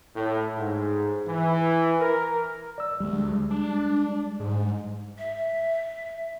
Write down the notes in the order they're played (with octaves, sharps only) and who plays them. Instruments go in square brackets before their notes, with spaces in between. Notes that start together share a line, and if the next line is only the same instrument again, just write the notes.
[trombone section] A2
G#2
E3
A#4
[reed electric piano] D5 E6
[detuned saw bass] D2 [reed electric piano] G3 G#3
[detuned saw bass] D4
G#2
[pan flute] E5